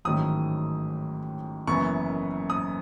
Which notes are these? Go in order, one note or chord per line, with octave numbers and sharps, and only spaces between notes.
A1 G#2 D#3 F#3 A3 D#6
F#1 F#2 E3 B3 C#6
D#6